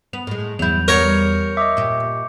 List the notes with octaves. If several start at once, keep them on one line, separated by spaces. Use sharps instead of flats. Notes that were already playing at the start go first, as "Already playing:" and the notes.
B3 F7
A2 G#3
E2 F#3 E4 G6 F7
G3 B3 A#4 C#5 C#6 C#7
D#5 E5 D6
A#2 G4